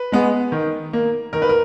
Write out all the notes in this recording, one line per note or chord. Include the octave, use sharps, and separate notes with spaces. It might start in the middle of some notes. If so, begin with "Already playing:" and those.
Already playing: B4
G#3 B3
D#3
A#3
D#3 A#4
B4
A#4